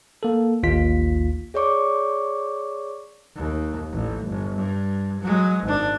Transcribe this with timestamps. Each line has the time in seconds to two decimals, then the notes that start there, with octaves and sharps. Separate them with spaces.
0.23 A#3 A4
0.63 A1 D#2 F4 B6
1.54 G#4 C#5 D5 C#6 D6
3.35 D#2
3.92 A1
4.25 G1
4.55 G2
5.21 F#3 G#3
5.63 G#1 D4